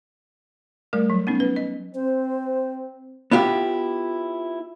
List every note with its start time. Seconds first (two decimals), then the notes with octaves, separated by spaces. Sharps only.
0.93 G3 A3 A#4
1.10 F#3
1.27 B3 C#4 D#4
1.40 B4
1.56 D#5
1.95 C4 C5
3.31 B3 E4 F4 G4